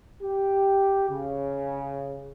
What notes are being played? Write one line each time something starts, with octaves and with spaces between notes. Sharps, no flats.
G4
C#3